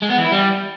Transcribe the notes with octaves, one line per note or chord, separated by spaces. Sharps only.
G#3
B3
E3
E4
G3